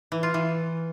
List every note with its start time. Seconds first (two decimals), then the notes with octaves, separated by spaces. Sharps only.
0.12 E3
0.23 F4
0.34 E3